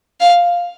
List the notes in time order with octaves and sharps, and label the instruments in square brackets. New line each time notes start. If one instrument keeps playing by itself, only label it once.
[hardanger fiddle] F5